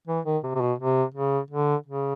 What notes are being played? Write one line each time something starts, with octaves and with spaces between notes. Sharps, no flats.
E3
D#3
C3
C3
B2
C3
C#3
D3
C#3